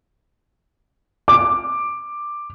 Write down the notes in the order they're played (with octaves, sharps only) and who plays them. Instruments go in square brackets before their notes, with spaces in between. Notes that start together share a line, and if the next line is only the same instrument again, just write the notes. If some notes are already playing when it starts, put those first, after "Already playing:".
[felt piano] D6